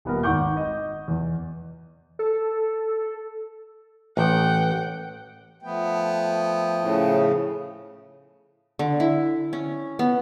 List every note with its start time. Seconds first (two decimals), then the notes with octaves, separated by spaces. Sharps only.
0.05 D#1 B3 A#4
0.23 G#1 D#3 F#5 C#6 D6 G6
0.57 D#5
1.08 E2
2.19 A4
4.17 A1 F#5 G5
5.63 F3 A3 B3 G5
6.82 A2 C#3
8.79 D3
9.00 E4
9.53 C#4
9.99 B3